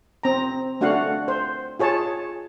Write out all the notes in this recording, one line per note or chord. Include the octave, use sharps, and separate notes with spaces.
C4 A#5
A3 D4 F#4 F5 F#5
C5
F4 G#4 C#5 A5